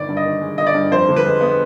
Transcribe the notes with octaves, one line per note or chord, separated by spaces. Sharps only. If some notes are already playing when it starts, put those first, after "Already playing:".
Already playing: G1 D#3 D5
G2
D#5
D#3
G#3
G1 D#5
D5
G2
F2 C5
D3
B4
G#3
B3